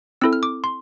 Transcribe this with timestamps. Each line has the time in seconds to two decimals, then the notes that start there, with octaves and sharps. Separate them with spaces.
0.21 C4 E4 A4 E6
0.33 F6
0.43 D6
0.64 C6